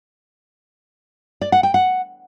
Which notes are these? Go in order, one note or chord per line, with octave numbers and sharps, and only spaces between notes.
D5
F#5
G5
F#5